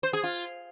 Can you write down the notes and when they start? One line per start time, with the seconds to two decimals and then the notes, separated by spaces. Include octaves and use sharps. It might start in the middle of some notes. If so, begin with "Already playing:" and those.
0.03 C5
0.13 G#4
0.24 F4